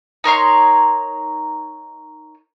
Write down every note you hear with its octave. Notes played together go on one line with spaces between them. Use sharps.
D#4 A#4 C#5 C6